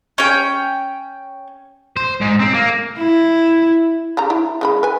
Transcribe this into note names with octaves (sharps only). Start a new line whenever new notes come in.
C#4 G5
C5
G#2
C4
A#3
E4
C#3 G3 A#5
E4
C#3 G#3 B5
B4 G#5